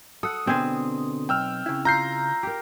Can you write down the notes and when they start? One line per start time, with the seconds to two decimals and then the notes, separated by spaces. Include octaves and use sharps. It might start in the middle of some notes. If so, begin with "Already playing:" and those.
0.23 A4 F#5 D#6
0.47 B2 D3 B3 C4 G#4
1.29 B1 G5 E6 F6
1.66 C#3 E4
1.85 F4 A#5 G6 C7
2.43 G4 A#4